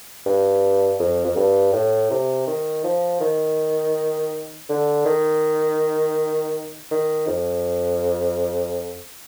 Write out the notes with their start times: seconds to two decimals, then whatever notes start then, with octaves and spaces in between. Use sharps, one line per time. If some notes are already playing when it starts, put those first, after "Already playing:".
0.26 G2
0.99 F2
1.25 F2
1.36 G2
1.73 A2
2.10 C3
2.47 D#3
2.84 F3
3.21 D#3
4.69 D3
5.05 D#3
6.91 D#3
7.27 F2